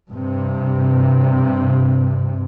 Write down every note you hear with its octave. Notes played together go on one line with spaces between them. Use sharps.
G2 C3